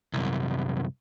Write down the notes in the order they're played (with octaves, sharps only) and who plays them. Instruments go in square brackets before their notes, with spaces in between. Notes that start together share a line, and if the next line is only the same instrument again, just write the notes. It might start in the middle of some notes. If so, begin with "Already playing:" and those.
[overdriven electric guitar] C2 F#2